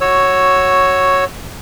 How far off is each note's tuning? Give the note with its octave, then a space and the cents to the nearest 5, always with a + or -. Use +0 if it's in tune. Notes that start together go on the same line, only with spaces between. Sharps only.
F#4 +0 C#5 +0 E6 +0